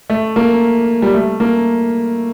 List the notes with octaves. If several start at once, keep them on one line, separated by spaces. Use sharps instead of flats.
A3
A#3
G3
A3
A#3